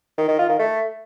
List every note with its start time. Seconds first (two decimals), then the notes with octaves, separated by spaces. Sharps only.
0.18 D#3
0.28 D#3
0.39 F4
0.49 D#3
0.59 A3